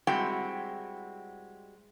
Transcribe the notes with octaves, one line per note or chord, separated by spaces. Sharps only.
G3 G#3 C4 E4 F#4 G5